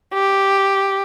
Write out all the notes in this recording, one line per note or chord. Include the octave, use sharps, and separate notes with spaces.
G4